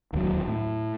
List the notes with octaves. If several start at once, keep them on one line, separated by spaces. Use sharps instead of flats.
D1 D#2 D#3 F#3
A2